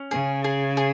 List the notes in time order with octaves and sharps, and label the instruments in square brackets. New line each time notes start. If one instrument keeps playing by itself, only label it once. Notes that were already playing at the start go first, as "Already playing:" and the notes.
Already playing: [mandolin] C#4
[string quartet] C#3 [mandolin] G#4
[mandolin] G#4
G#4